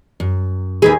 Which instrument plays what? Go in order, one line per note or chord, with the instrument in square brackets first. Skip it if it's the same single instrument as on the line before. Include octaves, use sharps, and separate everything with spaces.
[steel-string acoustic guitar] F#2
[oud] D#2 G#4 [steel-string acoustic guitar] D#4 B4